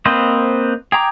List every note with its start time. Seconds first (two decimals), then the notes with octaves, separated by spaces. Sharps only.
0.05 A#3 C4 B4 C5 D#5
0.92 G#4 G5 A#5 D6